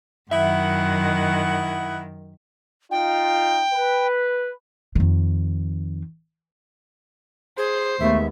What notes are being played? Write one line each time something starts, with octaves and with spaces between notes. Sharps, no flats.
F#2 D#3 E4 D#5 E5 F#5
D#4 F4 G5
B4
F2 D#3
G#4 C5
D#2 G#3 A3 B3 E5